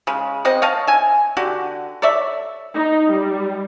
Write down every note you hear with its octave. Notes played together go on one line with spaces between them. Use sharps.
C#3 G#3
C4 C5 D#5 F#5
C#5 D#5 F5 A5
E5 G#5
D3 F#4 G4
A4 C#5 D5 E5
D#4
G3